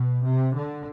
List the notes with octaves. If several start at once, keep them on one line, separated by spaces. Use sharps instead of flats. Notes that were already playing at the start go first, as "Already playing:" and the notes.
Already playing: B2
C3
D3